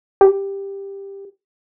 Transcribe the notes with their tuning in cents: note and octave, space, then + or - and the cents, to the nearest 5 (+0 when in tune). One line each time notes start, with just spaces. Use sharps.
G4 +10